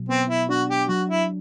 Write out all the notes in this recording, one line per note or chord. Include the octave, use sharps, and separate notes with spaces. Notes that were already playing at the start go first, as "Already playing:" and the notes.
Already playing: B2 F#3
B3 C4
E4
D4 F#4
G4
F#3 F#4
E4